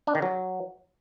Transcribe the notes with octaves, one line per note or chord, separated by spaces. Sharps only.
D4
D#3
F#3